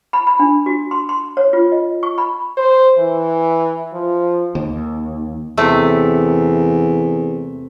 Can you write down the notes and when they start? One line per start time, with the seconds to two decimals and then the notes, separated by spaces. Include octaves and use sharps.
0.13 B5
0.27 B5
0.39 D4
0.66 F#4
0.91 C6
1.09 C6
1.37 C#5
1.53 F4
1.72 D#5
2.03 C#6
2.18 B5
2.58 C5
2.98 E3
3.93 F3
4.55 D#2
5.57 E2 C3 A3